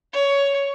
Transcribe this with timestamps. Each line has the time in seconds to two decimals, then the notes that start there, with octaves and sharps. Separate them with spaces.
0.13 C#5